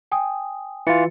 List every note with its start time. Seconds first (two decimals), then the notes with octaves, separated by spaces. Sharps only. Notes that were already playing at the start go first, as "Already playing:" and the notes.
0.12 G5 G#5 D#6
0.87 E3 F4 A6 C#7